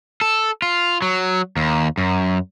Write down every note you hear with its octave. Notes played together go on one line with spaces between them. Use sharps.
A4
F4
F#3
D#2
F#2